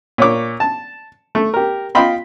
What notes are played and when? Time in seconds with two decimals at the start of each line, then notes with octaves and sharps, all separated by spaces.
0.18 A#2 C#5 D6
0.60 A5
1.35 A3
1.54 G4 A#4
1.95 F4 D#5 G5 B5 C6